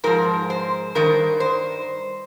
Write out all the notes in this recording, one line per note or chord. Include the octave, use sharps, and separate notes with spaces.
G#2 F3 A#4
C5
G2 D#3 A#4
C5